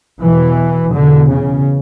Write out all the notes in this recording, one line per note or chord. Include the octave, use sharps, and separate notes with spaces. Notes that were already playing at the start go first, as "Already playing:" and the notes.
E2 B2 E3
E2 B2 D3
C#3